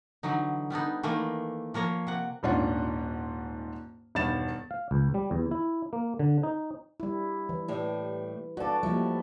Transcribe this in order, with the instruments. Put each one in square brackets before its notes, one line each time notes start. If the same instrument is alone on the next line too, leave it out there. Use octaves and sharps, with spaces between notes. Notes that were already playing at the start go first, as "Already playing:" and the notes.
[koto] D3 E3 F#3 D#4
G3 B3 D4 D#4
D#3 E3 A3 A#3
F3 A#3 C#5 A#5
C3 F#5
[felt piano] D#1 G#2 C#4 D4 F4 F#5
E1 G2 D#3 A6 E7
[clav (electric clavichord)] F5
C#2
G3
E2
E4
A#3
D3
D#4
[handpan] G3 E4
E3
[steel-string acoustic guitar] A2 G3
[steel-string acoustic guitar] G2 A4 [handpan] F#4 D5
[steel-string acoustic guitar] D#2 A3 [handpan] F3 G3 E4